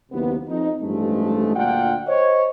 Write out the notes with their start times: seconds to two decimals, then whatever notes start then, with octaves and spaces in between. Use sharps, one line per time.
0.12 F#1 D#2 C3 A#3 B3
0.49 F2 D#4
0.82 A1 G2 F3 G#3 A3
1.56 D2 A#2 D4 F4 F#5 G5
2.07 C5 C#5 D#5